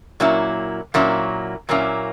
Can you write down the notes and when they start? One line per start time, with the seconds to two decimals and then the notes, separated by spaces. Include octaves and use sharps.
0.20 A#2 F#3 A#3 C#4 E4
0.94 A#2 F#3 A#3 C#4 E4
1.69 A#2 F#3 A#3 C#4 E4